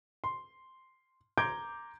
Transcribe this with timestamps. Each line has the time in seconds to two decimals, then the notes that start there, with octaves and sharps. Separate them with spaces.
0.24 C6
1.38 A#5 C6 D6 G6 G#6 D7